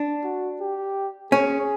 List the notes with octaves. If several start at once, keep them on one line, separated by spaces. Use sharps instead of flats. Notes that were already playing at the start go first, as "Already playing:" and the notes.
Already playing: D4
F#4
G4
C#4 G#4